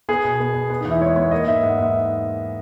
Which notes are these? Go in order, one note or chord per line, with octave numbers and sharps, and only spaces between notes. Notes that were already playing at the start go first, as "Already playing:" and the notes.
B3 G#4
B2
B3
B3
B3
E2 D#4
E4
G#3 C#5
B3 C#5
A#3 D#5
G#2 E5
G#2 F#5
G#2 E5